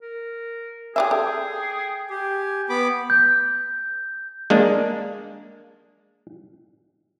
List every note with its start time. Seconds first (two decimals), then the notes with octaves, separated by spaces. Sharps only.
0.01 A#4
0.96 G4 G#4 D5 E5 G#5
1.11 A4 G5
2.10 G4 G#5
2.69 B3 B5 D6
3.10 G6
4.50 G#3 A#3 D4